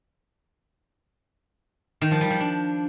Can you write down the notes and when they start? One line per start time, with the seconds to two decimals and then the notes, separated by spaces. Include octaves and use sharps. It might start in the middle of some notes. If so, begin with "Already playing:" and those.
2.01 D#3
2.11 F3
2.21 G3
2.31 F3
2.40 D4